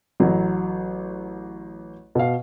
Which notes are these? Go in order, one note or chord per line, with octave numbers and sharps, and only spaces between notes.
A1 F#3
B2 F5